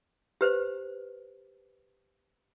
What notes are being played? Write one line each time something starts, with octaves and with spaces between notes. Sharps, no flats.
G4 B4 C5